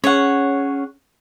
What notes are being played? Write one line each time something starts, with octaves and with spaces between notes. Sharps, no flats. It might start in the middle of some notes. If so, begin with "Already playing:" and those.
C#4 G#4 C#5 F#5